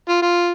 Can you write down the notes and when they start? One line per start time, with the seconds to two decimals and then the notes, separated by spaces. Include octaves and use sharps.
0.09 F4
0.22 F4